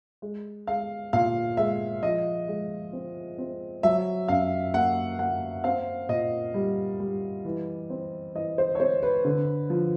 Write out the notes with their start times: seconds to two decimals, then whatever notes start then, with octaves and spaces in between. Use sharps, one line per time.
0.22 G#3
0.67 G#3 F5
1.13 A#2 F5
1.57 G#3 E5
2.03 F3 D#5
2.48 G#3
2.93 C4
3.38 C4
3.83 F#3 E5
4.28 F#2 F5
4.74 A#3 F#5
5.19 A#3 F#5
5.64 C4 F5
6.09 A#2 D#5
6.54 G3
7.00 G3
7.45 E3
7.90 C4
8.35 E3 D#5
8.58 C5
8.75 C#5
8.80 C4 C5
9.03 B4
9.25 D3
9.70 F3